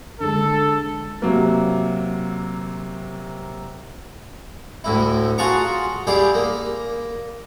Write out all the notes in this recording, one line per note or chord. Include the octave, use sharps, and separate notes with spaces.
D3 G#3 A4
C3 F#3 A#3
D2 A2 E4
F4 F#4 G#4 A5 A#5 C#6
E4 G4 G#4 D5 F5
A#3